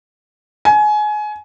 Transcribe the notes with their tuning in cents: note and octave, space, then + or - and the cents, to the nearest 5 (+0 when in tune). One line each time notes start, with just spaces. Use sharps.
G#5 +25